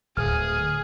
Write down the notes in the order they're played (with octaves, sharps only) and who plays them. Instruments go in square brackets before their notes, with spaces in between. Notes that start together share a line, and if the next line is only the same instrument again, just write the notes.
[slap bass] D1 [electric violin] G#4 [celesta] F6